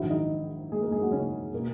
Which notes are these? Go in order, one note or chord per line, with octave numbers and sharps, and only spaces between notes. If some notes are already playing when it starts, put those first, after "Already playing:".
Already playing: A#1 G#2 D#3 F#3 E4 E5
D#4 D#5
G#3 G#4
A#3 A#4
G#3 G#4
F#3 F#4
C#3 C#4
B2 A#3